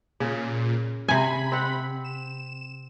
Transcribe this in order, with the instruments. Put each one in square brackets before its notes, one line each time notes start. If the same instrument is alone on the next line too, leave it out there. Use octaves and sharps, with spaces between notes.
[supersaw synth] A#2 [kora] C#3
[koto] C3 G#5 [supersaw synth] B5
[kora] C4 F#5
[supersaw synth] E7